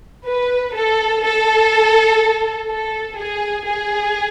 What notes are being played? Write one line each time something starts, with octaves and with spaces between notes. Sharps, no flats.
B4
A4
A4
A4
G#4
G#4